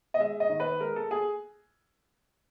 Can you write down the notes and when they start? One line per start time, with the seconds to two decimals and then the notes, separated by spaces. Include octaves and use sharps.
0.14 D#5
0.20 G#3 E5
0.40 D#5
0.49 D#3
0.60 B4
0.80 G#3 A#4
0.96 A4
1.11 G#4